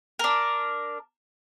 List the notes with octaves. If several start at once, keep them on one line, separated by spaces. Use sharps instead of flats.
D4 A#4